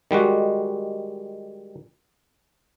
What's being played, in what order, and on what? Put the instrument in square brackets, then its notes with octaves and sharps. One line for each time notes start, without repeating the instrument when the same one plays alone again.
[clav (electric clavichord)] D#3 G3 G#3 F#4